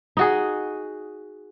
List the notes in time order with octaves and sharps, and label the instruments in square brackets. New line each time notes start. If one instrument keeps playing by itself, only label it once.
[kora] D#4 F#4 G#4